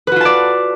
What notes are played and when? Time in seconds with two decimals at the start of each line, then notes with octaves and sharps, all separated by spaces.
0.07 B4
0.12 F#4
0.16 F4
0.21 A5
0.25 D5